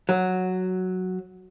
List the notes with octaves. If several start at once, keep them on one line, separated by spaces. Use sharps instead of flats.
F#3